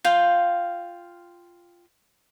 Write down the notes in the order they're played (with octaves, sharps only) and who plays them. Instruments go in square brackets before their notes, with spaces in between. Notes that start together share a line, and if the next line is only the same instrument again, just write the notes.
[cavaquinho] F4 F5 G5